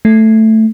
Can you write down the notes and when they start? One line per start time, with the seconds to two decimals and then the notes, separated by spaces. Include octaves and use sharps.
0.05 A3